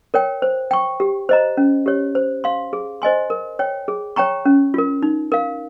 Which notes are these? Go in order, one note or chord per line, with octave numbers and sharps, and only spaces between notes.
A#4 C#5 G5
C5
G5 C#6
G4
C5 D#5 A#5
C#4
G4 C#5
C5
F5 C6
G#4
C5 D#5 G#5 C6
A#4
C#5 G5
G#4
C#5 G5 A#5 C#6
C#4
F4 A#4
D#4
A#4 F5